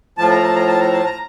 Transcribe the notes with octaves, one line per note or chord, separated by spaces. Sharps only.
A2 F3 A5
A#5
A5
A#5
A5
A#5
A5
A#5